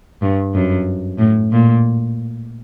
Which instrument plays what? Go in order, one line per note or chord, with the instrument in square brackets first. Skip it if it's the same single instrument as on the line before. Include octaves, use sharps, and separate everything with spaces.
[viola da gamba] G2
F#2
A2
A#2